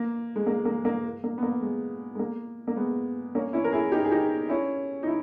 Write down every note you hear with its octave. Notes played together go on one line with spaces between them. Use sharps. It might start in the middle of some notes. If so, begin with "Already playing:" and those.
Already playing: A#3
G#3
A#3
A#3
A#3
A#3
B3
A#3
G#3
G#3
A#3
A#3
G#3 B3
A#3 C#4
C#4 E4
A#4
E4 G#4
D#4 G4
G#4
D#4 G4
C#4 E4
D#4
E4